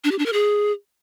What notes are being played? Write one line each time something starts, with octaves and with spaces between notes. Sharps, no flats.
D4
G4
D4
A#4
G#4